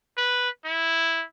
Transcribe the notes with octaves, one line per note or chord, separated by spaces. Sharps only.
B4
E4